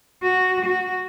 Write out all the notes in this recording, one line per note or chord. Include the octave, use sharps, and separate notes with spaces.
F#4
F#4